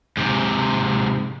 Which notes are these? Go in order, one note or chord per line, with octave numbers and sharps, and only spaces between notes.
G#2 C3